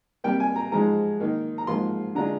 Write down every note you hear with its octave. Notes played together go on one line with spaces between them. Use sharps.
C3 G3 A#3 G5
G#5
A#5
G#2 F3 G#3 D#4 A#5
D#3 A#3 D#4
A#5
G#2 F3 A#3 F4 C6
D3 G#3 D4 F4 A#5